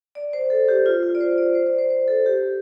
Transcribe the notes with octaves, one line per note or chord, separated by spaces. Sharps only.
D5
C5
A4
G4
F4
F4
D5
C5
D5
C5
D5
C5
C5
A4
G4